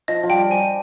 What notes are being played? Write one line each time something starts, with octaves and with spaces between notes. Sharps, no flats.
F3 D#5
F3
G3 G5
G3 G#5